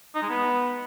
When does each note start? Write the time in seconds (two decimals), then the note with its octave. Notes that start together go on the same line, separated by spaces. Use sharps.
0.15 D#4
0.22 G#3
0.29 B3